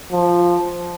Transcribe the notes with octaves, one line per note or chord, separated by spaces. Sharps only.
F3